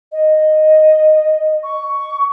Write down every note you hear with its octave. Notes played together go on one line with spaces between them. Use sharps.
D#5
C#6